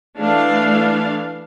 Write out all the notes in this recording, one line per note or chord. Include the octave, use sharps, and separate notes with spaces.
E3 A3 D4 F5